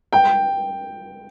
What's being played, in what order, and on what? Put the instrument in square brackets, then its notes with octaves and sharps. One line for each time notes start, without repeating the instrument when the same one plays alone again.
[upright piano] G5